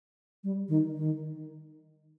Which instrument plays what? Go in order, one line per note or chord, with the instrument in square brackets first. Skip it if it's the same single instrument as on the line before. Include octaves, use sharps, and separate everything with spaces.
[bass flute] G3
D#3
D#3